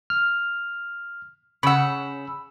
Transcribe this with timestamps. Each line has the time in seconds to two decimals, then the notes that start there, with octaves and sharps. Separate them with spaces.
0.10 F6
1.63 C#3 F#5 B5 E6